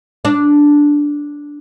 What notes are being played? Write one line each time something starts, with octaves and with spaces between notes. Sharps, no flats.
D4